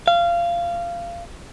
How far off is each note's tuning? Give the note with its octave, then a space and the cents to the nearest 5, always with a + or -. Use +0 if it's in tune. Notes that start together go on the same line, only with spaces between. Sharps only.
F5 -20